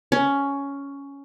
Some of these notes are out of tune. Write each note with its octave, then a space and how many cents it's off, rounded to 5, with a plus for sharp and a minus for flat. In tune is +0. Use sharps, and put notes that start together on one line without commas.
C#4 +10